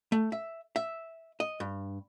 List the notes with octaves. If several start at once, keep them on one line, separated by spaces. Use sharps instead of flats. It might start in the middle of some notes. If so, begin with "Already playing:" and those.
A3
E5
E5
D#5
G2